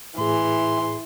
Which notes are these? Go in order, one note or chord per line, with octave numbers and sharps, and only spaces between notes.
A2 E3 G#4 C6